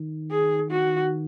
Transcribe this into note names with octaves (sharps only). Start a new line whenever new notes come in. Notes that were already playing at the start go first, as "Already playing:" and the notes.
Already playing: D#3
G#4
F#4